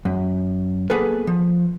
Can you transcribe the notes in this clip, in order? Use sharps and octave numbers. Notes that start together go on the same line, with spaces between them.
F#2
A#3 B3 G#4 A4 B4
F3